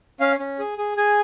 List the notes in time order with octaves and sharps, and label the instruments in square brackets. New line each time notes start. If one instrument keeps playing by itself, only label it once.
[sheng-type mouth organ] C#4 F5
C#4
G#4
G#4
G#4 G#5